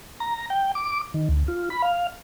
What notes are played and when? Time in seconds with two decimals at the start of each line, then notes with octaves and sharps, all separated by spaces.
0.20 A#5
0.50 G5
0.75 D6
1.14 D#3
1.29 D2
1.48 F4
1.70 B5
1.82 F5